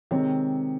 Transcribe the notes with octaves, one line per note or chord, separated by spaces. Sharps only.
C3 D#3 G#3 C4 C#5